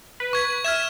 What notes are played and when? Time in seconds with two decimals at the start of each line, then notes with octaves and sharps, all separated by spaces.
0.20 B4
0.33 C#6 G#6
0.64 E5 F6 G#6 E7